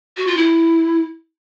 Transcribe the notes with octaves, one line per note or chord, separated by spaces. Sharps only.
F#4
F4
E4